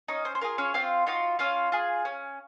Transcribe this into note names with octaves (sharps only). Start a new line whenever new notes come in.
C#4 D#4 D#5
C5
C5
F4 G#4 A#4
C#4 C#5
C4 F4 F5
D#4 F4 F#4 F5
C#4 F4 F5
F4 G#4
C#4